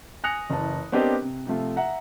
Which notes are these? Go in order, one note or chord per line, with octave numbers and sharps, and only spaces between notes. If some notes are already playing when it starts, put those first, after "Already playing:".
G#5 D#6 F#6 A#6 C#7 F7
F#1 E3 A5
B3 C4 D4 G4 A#4 D#5
C3
C3 F3 A3 F4
E5 F#5 A#5